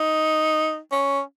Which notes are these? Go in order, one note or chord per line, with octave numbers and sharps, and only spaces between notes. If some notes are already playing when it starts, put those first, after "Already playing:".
Already playing: D#4
C#4